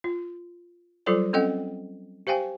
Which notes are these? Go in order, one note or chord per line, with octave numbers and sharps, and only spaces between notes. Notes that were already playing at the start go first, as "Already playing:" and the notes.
F4
F#3 G3 F4 A4 C5 D5
C4 C#4 A4 D#5 F#5 G5
G4 C5 F5 G5 G#5